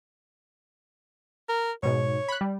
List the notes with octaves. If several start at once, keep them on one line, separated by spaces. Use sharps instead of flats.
A#4
G#2 B2 C#5
B5 F#6
G3